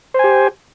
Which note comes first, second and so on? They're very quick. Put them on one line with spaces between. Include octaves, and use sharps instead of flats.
C5 G#5 G4